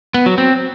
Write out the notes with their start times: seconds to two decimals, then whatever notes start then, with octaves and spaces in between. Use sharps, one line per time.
0.14 B3
0.26 F#3
0.38 C4